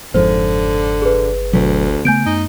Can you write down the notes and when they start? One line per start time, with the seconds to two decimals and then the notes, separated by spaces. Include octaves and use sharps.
0.14 G1 F2 G#2 D3 F3 C5
1.02 G#4 B4
1.53 D2 B2 F#3
2.05 C#3 A3 B3 G#5 G6 D7
2.26 F#2 D#4